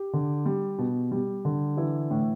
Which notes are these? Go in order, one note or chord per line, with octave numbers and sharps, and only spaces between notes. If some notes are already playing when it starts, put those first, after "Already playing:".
Already playing: G4
D3
G3
B2
G3
D3
E3 E4
A2